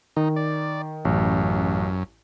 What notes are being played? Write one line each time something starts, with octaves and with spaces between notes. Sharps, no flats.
D#3 D#4
D5
A1 F#2